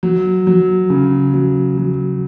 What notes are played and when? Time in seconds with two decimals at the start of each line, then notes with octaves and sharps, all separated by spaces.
0.03 F#3
0.47 F#3
0.90 C#3
1.34 F#3
1.78 F#3